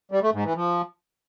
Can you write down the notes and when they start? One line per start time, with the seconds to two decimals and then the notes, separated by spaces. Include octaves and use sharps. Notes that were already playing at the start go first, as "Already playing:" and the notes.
0.12 G3
0.23 A3
0.34 G#2
0.44 E3
0.55 F3